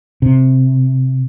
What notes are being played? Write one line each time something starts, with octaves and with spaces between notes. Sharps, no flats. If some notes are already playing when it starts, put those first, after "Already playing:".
C3